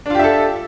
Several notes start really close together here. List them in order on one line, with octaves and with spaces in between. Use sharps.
D4 F4 G4 E5 A4